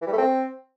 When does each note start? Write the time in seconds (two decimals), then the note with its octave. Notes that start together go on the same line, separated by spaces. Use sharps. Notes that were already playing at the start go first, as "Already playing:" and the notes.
0.02 E3
0.07 G3
0.13 A3
0.18 C4